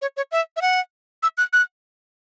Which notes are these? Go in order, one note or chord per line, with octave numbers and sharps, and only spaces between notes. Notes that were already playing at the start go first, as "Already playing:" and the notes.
C#5
C#5
E5
E5
F#5
E6
F#6
F#6